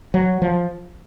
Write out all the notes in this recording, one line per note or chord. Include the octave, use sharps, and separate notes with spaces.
F#3
F3